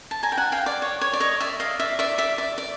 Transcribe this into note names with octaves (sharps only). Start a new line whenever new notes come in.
A5
G#5 A#5
G5
F#5 G#5
F5 G5
D5
C#5
C#5
D5
C#5 D#5
D5 E5
D#5 F5
D5 E5
D5 E5
D5 E5
D5
D5